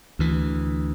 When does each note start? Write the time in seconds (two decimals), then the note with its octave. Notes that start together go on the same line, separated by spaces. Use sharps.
0.19 D2 E3